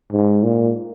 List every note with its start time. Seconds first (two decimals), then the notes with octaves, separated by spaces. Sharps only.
0.12 G#2
0.44 A#2